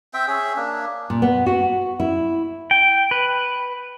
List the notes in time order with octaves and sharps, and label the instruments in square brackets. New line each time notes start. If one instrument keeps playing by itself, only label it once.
[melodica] C4 C5 E5 G5
C#4 G#4 E5
A#3 D4
[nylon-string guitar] A#2
B3
F#4
E4
[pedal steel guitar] G5
B4